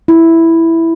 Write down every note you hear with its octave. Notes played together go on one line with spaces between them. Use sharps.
E4